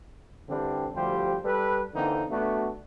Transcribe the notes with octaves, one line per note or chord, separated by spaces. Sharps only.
D3 E3 G3 C4 D4
D2 F3 G3 G4 C5
G3 A4 B4
D3 E3 A#3 C4 D#4
A3 B3 D4 F#4